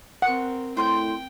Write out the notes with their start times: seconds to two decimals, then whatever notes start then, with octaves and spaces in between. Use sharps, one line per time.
0.22 C4 A#4 F#5
0.77 A2 C5 G5 C6 G6